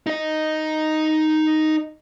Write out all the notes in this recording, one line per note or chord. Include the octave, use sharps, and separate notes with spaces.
D#4 D#5